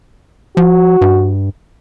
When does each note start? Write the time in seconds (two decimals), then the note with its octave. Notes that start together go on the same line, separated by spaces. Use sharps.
0.57 F3 F#4
1.01 G2